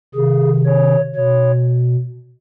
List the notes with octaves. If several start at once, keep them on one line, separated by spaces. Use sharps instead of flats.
C3 D#3 G#4
C#5
B2 C#5